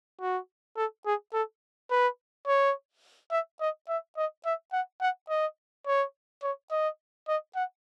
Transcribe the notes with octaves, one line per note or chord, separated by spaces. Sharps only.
F#4
A4
G#4
A4
B4
C#5
E5
D#5
E5
D#5
E5
F#5
F#5
D#5
C#5
C#5
D#5
D#5
F#5